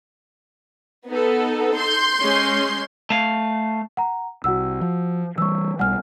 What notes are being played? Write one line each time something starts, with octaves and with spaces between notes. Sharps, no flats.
B3 D#4 A4
C6 G6
G#3 C#4
A3 F5
F#5 A#5
C2 F#4 F#5 E6
F3
E3 G3 C#6 E6
B1 G3 F#5 G#5 F6